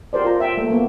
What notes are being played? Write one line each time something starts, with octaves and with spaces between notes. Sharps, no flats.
G4 A#4 C5 D5
F4 A#5
E5 G5
A3 A#3
A#3 B3